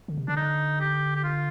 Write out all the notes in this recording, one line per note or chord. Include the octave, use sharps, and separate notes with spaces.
D3
C3
D3 D4
D#4
G4
G4
F4